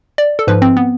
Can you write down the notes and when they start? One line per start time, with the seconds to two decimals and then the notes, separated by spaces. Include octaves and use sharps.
0.18 D5
0.39 A4
0.47 G#2 F3 B4
0.62 C4
0.77 B3